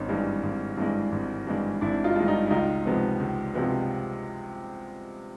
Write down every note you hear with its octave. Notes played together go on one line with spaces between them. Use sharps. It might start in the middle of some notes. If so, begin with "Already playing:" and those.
Already playing: G#1 C#4 D#4
G2 E3 G#3
G#1
G2 E3 G#3
G#1
G2 E3 G#3
G#1 D4 E4
D#4 F4
G2 E3 G#3
D#4 F4
E4
C#2 D#4 F4
C3 F3 G#3 B3
C#2
C3 F3 G#3 B3